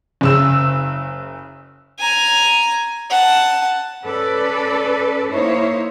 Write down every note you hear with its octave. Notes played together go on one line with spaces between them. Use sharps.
F#1 C#3 E6
G#5 A#5
F#5 A5
C#4 A4 B4 D5
A#3 D#4 E4 C5 C#5